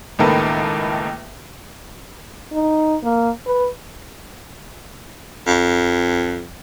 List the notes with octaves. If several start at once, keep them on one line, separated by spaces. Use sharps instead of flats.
C#2 A2 D#3 A#3 A4 B4
D#4
A#3
B4
F2